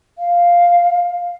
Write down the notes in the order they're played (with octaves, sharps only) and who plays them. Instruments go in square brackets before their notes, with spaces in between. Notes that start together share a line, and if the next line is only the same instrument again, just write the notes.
[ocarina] F5